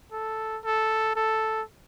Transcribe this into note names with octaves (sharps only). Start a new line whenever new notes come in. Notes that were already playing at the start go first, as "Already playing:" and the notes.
A4
A4
A4